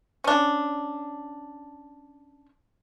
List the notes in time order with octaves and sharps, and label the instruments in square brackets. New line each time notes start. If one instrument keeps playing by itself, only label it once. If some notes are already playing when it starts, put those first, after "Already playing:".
[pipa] C#4 D4